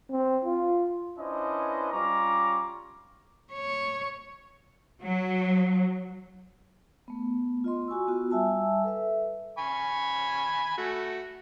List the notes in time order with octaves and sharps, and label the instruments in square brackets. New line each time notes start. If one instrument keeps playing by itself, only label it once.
[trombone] C4
F4
[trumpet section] C#4 D4 E4 B4 C5 D#5
G3 C#4 F4 A#5 C#6 D6
[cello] C#5
[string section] F#3
[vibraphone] A3 B3
F4 D#5 C6
F#4 G#5 C#6 E6
B3 F4 F#4
G3 E5 G#5 A5 E6
A4 B4 E5
[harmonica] G#5 B5 C#6
A3 F#4